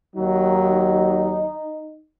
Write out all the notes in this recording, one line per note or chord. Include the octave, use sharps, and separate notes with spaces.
D#2 F#3 D#4